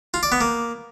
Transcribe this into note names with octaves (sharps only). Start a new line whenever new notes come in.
F4
D5
B3
A#3